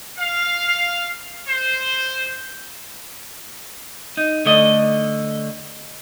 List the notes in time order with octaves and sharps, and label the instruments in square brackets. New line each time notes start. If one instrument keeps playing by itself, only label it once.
[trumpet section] F5
C5
[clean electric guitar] D#4
D3 A3 D#5